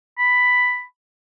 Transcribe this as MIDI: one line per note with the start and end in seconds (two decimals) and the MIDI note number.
0.19 0.83 83